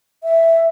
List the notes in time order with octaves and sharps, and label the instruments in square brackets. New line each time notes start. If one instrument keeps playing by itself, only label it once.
[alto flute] E5